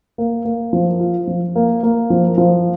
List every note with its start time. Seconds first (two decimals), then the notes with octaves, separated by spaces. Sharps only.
0.18 A#3
0.45 A#3
0.73 F3
1.00 F4
1.27 F3
1.55 A#3
1.83 A#3
2.10 F3
2.38 F3